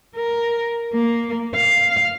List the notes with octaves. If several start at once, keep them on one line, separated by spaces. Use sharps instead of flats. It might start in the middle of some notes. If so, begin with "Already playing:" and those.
A#4
A#3
F5